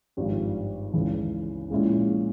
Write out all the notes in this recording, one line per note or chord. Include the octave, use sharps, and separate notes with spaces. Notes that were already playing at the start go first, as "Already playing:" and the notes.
G#1 G2 F3
C#2 C#3 E3
A#1 A#2 G#3 C#4 E4